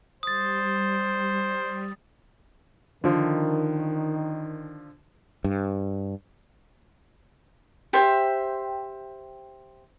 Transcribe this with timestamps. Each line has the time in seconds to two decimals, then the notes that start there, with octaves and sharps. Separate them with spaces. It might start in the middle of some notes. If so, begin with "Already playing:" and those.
0.23 G3 C5 D#6 A6
3.04 D3 D#3 F3
5.44 G2
7.93 G4 C5 E5 G5